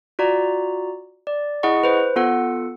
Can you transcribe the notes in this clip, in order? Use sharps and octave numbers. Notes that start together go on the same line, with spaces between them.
F4 F#4 D5 A#5
D5
E4 G#4 D#5 F#5 C#6
B4 C5
B3 F4 A4 F#5